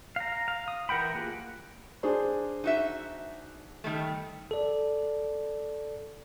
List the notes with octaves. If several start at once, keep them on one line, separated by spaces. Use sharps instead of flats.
F5 A#5
F5
D#6
E3 A#4 F#5 G5 B5
A#3 F4 G4 G#4 F#5
D4 G#4 C5
D#4 F#4 E5
D#3 G3 A3
A4 D5